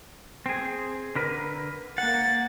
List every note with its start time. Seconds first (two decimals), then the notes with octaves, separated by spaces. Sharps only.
0.46 C4 G#4
1.15 D3 A#4 B4
1.98 A#3 F#5 A6